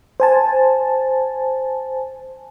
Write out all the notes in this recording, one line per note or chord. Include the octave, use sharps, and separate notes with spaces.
C5 G#5 A5